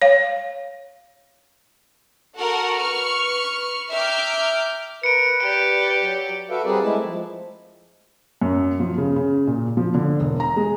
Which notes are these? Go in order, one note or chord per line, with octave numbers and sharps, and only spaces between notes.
C#5 F5
F#4 A4 A#4 F#5
B4 C#6 F6
E5 G5 A#5 D6 F6 G6
A#4 B4 C#7 D7
G4 D5 D7
F#3
F#4 A4 B4 E5 F5
G3 C4 G#4 A#4 B4 D5
G#3 A3 E4 A5
F3
F#2
F3
C#3
C#3
A#2
F3
D3
E1
A#5
G#3